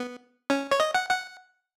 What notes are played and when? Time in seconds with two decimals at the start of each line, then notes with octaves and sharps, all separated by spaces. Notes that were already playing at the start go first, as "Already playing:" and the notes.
Already playing: B3
0.50 C#4
0.71 C#5
0.80 D#5
0.94 F#5
1.10 F#5